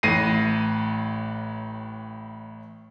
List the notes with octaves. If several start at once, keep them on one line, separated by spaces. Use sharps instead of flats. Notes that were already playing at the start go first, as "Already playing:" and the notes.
A1 A2 A#6 C7 D#7